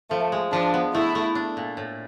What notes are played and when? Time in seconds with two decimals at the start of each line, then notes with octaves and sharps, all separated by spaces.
0.11 F3 A3
0.32 G#3
0.53 F3 D4
0.74 B3
0.95 A3 E4
1.15 A3
1.35 D4
1.57 A#2
1.77 A2